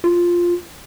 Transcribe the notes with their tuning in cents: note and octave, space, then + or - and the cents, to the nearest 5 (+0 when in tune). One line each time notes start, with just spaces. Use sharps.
F4 +0